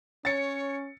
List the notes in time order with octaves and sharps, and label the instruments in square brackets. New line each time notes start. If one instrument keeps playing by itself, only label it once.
[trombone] C#4 [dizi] C#5 [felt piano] A6 C#7